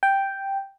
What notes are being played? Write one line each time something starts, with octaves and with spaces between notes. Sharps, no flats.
G5